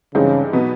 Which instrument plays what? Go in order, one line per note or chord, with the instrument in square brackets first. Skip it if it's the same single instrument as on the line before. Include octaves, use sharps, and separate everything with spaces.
[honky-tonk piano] G2 E3 G#3 C4 D#4 [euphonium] C#3
[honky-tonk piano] B2 F#3 B3 D#4